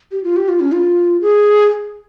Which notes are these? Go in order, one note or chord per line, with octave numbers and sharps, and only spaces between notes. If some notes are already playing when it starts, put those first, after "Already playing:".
G4
F4
G4
F4
C#4
F4
G#4